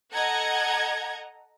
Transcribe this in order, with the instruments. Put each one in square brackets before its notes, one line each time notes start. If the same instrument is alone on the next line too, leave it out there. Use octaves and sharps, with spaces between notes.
[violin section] A4 D#5 F#5 A#5 G#6